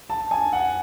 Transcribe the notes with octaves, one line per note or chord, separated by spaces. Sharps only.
A5
G#5
F#5